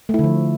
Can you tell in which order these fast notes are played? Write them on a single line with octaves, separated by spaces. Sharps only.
A3 E4 D3 F3